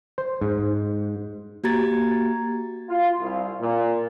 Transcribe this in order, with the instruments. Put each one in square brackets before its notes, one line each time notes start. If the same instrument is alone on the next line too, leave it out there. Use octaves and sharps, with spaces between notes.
[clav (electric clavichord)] C5
G#2
[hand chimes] A#3 F#4 G4 A#5 G#6 A6
[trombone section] F4
C2
A#2